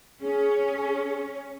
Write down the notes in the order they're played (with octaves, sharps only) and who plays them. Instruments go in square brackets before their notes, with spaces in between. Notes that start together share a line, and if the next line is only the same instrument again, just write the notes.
[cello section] C#4 [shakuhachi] G#4